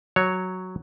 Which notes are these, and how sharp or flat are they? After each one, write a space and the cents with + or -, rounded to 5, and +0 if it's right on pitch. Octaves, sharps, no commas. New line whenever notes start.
F#3 +0 C#5 +0